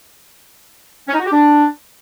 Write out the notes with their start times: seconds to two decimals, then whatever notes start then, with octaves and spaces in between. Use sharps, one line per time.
1.08 C#4
1.14 D#4
1.20 F#4
1.26 G4
1.32 D4